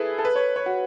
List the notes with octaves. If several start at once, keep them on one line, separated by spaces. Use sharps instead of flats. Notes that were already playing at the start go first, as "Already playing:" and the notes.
Already playing: E4 G#4 A4 B4
A4
B4
C#5
C#5
F#4